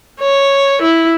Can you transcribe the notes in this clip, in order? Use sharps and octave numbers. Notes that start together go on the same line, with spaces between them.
C#5
E4